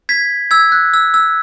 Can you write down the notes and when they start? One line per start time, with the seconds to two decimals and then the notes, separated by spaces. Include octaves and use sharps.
0.09 G#6 B6
0.51 E6 G#6
0.72 F#6
0.94 E6
1.14 E6